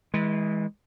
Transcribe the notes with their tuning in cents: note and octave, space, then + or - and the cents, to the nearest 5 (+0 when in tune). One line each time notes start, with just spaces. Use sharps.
E3 -30 G#3 +0